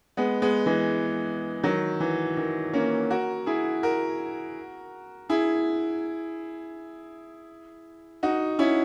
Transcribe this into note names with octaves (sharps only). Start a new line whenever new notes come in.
G#3 B3
G#3 B3
E3 G#3
D#3 F#3
E3
D#3
A#3 C#4
F#4 A#4
E4 G#4
F#4 A#4
E4 G#4
D#4 F#4
C#4 E4